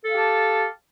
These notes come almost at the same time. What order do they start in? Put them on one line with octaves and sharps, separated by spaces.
A4 F5 G4 A5